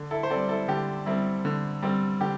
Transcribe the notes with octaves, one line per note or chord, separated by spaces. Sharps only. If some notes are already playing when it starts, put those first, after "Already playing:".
Already playing: D3
E4 A4
C5
G3 C4 A4 D5
E4 A4
D3 G4
G3 C4 E4
D3
G3 C4
D3 G4